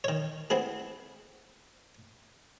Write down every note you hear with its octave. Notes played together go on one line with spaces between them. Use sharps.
D#3 C#5
B3 C4 E4 G#4